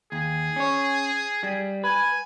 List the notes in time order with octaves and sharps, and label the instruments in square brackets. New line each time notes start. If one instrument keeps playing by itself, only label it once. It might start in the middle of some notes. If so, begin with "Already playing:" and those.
[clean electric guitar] D#2 [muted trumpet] G#4
[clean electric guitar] C#4 C#5
G3
[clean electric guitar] B4 [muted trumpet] G#5